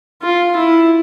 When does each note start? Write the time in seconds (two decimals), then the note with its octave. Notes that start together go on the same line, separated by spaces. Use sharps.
0.22 F4
0.56 E4